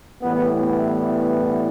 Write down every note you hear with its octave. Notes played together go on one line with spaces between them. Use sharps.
A2 E3 G3 B3
B3